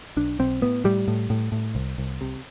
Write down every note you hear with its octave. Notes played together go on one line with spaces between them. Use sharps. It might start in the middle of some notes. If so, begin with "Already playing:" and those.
B1 D4
B1 C4
A2 B3
A2 G3
A2
A2
A2
C2
C2
C3